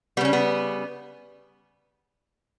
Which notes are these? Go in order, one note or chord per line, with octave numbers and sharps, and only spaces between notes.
C#3 G3 B3 C#4
B3